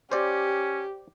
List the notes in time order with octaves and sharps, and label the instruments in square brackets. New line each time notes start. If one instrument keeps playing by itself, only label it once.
[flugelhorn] C#4 [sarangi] G4 [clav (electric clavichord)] C5 D5